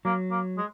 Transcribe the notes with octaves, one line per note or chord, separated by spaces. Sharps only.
F#3 A#3
A#3
G#3